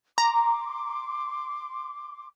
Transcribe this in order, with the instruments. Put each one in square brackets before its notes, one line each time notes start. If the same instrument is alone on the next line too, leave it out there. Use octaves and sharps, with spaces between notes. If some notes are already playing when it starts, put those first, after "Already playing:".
[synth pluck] A#5 [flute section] C6 D6